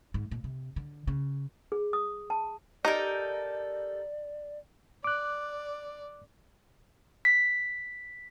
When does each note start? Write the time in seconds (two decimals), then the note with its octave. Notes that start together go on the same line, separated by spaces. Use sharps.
0.14 G#2
0.31 A#2
0.44 C3
0.76 D3
1.07 C#3
1.72 G#4
1.93 D#6
2.30 A5
2.85 D#4 G4 A4 A#4 D5
5.04 D5 D6 F#6
7.25 B6